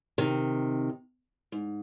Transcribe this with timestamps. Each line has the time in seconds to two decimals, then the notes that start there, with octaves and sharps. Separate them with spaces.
0.18 C3 D#3
1.52 G#2